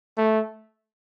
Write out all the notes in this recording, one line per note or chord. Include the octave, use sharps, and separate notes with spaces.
A3